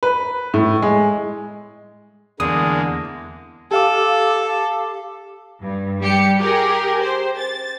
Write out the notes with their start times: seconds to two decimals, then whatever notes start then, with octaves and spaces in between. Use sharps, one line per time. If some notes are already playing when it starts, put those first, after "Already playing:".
0.03 B4
0.54 A2
0.82 G#3
2.40 E2 D3 G#3 A#3 D#6
3.71 G4 A4 F5 D6
5.62 G2
6.01 G3 G4 C#7
6.38 G4 G#4 A#4
7.02 C5
7.38 A6